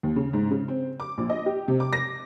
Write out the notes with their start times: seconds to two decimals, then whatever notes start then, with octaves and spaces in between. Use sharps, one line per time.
0.03 D#2
0.16 C#3
0.33 G#2
0.51 C#3
0.68 C4
1.00 D6
1.18 A#1
1.30 D#5
1.46 G4
1.68 C3
1.80 D6
1.93 A#6